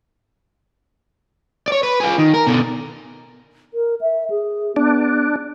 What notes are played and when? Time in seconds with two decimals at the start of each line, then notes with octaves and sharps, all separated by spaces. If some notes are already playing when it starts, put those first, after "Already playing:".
1.68 C#5 D5
1.83 B4
2.00 F4 G#4
2.18 D#3
2.34 A#4
2.47 B2 D3
3.74 A#4
4.01 E5
4.30 G#4
4.76 B3 D4